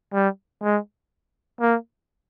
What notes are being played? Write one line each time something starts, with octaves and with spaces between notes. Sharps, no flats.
G3
G#3
A#3